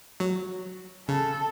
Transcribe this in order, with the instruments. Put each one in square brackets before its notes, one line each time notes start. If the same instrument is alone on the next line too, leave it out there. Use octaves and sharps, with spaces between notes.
[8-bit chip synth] F#3
[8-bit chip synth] C#3 [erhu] A4